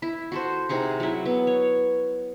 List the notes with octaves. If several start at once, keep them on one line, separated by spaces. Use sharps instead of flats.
E4
F#4 A4 C5
C3 D#4 G#4 F#5
F#3 E4
B3
C#5